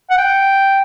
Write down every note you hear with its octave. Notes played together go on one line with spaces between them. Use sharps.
F#5
G5